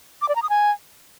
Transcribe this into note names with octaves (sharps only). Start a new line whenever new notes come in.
D6
D5
A#5
D#6
G#5